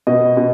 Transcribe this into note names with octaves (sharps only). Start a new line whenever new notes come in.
B2 D#5
B2